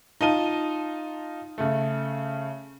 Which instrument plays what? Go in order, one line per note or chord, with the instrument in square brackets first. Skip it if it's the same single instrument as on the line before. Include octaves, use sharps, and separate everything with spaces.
[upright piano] D#4 F4 A5 D#7 G7
C#3 A3